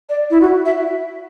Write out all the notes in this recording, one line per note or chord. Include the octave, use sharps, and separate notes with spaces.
D5
E4
F#4
E5